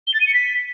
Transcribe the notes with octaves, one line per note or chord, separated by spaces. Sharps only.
G7
A6
D#7
C#7
B6